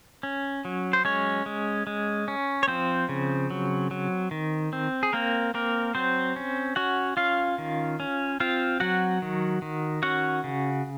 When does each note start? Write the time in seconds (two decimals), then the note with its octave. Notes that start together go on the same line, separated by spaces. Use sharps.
0.23 C#4
0.65 F#3
0.93 C5
1.05 G#3 C#4 C#5
1.46 G#3
1.87 G#3
2.28 C#4
2.63 C#5
2.68 F3 C4 C5
3.09 C#3
3.50 F#3
3.91 F#3
4.31 D#3
4.73 C4
5.03 G#4
5.13 A#3 C4 A#4
5.54 A#3 C4 A#4
5.95 F#3 C4 C5
6.36 C#4
6.76 C#4 F#4 F#5
7.17 C#4 F4 F5
7.58 D#3
8.00 C#4
8.40 C4 F4 F5
8.80 F#3 F#4 F#5
9.22 D#3
9.62 D#3
10.03 C#4 F#4 F#5
10.44 C#3